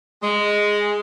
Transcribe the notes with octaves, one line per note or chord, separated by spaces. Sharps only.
G#3